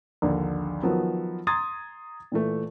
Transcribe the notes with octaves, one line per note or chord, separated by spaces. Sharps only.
A#1 D#2 D3
D#3 F3 F#3 B3
A#5 C6 D#6 G#6 A6
A#2 E3 A3